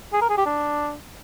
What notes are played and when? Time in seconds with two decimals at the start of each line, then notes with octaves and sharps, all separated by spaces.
0.13 G#4
0.21 A#4
0.30 G#4
0.38 G4
0.46 D4